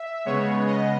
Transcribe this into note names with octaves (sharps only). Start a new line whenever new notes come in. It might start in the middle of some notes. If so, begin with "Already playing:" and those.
Already playing: E5
C#3 G#3 B3 C#5
D#5